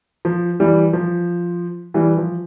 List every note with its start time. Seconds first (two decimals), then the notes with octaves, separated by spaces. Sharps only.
0.25 F3
0.60 E3 G3
0.93 F3
1.94 E3 G3
2.17 F3